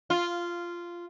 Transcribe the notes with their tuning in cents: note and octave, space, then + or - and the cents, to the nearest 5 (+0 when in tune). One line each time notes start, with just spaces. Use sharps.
F4 -10